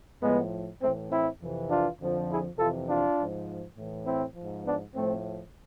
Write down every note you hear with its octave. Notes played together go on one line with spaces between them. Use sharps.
A2 F3 G#3 B3
A2 E3 A3 C4
C4 E4
F2 C3 E3
D4 F4
F2 D3 F3
E4 G#4
F2 C3 E3 F4 A4
D4 F4
G#2 F3
A2 E3
C4 E4
G#2 F3
B3 D4
A2 F3 A3 C4